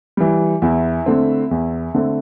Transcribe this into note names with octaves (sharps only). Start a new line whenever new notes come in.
E3 G3
E2 E4 E5
D3 A3 C4
E2
D3 A3 C4